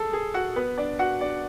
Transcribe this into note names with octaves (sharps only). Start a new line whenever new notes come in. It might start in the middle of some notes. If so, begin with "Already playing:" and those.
Already playing: G#4 A4
G#4
F#4 F#5
B3 B4
D4 D5
F#4 F#5
D4 D5